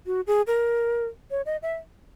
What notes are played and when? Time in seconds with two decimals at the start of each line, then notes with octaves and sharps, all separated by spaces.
0.06 F#4
0.27 G#4
0.47 A#4
1.31 C#5
1.46 D#5
1.62 E5